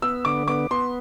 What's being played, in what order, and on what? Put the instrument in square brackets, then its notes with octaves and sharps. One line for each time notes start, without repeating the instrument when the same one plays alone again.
[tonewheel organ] B3 [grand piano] E6
[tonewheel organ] D3 [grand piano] D6
[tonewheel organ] B3 [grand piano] D6
[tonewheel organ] B3 [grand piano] C6